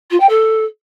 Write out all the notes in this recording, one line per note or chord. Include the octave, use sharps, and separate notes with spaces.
F4
G5
A4